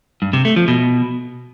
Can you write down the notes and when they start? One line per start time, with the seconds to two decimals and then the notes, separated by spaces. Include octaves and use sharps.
0.22 G2
0.33 C3
0.45 A3
0.56 F3
0.68 B2